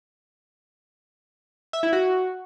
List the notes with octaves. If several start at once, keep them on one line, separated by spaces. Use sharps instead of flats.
E5
E4
F#4